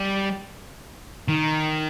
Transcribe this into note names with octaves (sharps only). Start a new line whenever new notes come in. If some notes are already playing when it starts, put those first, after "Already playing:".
Already playing: G3
D#3